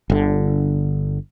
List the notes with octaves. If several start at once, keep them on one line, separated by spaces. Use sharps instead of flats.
G1 D3